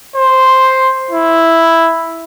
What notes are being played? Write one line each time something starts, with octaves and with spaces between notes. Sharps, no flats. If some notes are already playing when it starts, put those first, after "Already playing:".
C5
E4